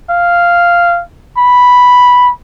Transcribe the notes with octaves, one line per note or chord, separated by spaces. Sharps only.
F5
B5